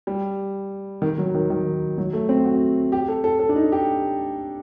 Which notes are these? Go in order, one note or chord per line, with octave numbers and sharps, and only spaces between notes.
G3
D#3
F#3
D#3
D#3
F#3
A3
C4
F#4
G4
A4
A4
A4
D4
D#4
G4